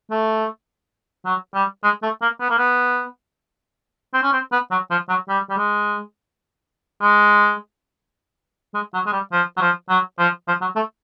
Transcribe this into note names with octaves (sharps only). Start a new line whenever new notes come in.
A3
F#3
G3
G#3
A3
A#3
B3
A#3
B3
C4
C#4
C4
B3
F#3
F3
F#3
G3
G3
G#3
G#3
G#3
F#3
G#3
G3
F3
F#3
F3
F#3
F3
F3
F#3
A3